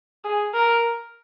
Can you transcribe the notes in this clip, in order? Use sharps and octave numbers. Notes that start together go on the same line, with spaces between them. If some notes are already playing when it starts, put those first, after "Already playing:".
G#4
A#4